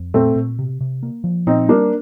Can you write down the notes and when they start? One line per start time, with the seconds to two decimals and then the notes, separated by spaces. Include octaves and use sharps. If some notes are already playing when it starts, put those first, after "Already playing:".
Already playing: F2
0.14 A#2 A3 C4
0.36 A#2
0.59 C3
0.81 C3
1.03 A#3
1.24 F3
1.47 A#2 C4 D#4
1.69 G3 A#3 D4